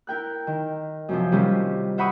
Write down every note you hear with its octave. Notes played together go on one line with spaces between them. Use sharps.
E4 A#4 G5 F#6
D#3
F#2 C3 F3
C3 D#3 G3 C#4 F4
C5 E5 F#5 B5 C#6 D#6